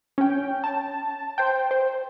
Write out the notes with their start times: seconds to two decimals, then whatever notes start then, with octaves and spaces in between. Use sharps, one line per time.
0.18 C#4 G5
0.64 A5
1.38 C5 G5
1.71 C5